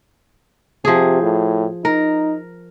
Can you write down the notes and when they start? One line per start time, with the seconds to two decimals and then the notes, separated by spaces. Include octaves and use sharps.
0.85 C3 F3 G#4
1.22 A2
1.85 D#4 A#4